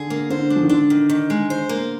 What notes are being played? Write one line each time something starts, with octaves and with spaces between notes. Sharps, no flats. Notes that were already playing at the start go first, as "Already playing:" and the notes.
Already playing: D3 G#4
A#3
D3 C5
D4
F3
D#3
D3 D4
D#3
D#3
G#3
C5
A#3